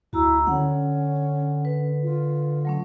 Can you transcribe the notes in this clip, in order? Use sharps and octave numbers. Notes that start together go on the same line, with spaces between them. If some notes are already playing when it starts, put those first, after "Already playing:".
D2 E4 F#4 A#5 E6
D3 C#4 F#5
B4
F4
F#3 A3 C#4